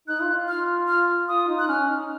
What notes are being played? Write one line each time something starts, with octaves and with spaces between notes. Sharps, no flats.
D#4 F#6
F4
F4
F6
F6
F4 D#6
D#4
F#6
C#4 F6
D#4